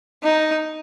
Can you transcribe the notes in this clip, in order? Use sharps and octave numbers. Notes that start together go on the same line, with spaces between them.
D#4